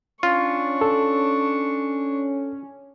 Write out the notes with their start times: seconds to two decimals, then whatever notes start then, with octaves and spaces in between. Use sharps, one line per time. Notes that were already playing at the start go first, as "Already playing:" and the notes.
0.23 C#4 D4 F4 C#6
0.81 A4